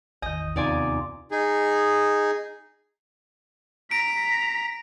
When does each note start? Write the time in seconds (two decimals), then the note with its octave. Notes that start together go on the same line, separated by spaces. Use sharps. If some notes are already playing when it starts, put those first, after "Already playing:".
0.22 A1 E2 D#3 D#5
0.56 D#2 C3 B3 D#4 F4 D5 G#5
1.31 D#4 G#4
3.91 A#5 B6 D7